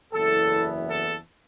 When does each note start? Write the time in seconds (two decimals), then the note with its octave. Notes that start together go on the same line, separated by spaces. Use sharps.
0.13 F#1 E2 E3 B3 E4 A4
0.89 A4